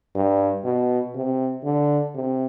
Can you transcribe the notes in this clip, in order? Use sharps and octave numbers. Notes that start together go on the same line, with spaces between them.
G2
B2
C3
D3
C3